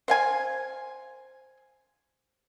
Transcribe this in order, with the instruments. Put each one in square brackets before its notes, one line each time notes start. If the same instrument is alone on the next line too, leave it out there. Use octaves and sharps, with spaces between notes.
[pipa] C5 F5 G#5